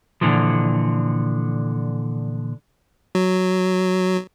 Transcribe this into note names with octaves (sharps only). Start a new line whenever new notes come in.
A#2 D3 E3 F3
F#3